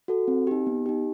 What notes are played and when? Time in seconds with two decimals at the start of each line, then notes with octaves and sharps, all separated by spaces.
0.08 F#4 A4
0.28 C4
0.47 D#4 G4
0.67 B3
0.86 D#4 G4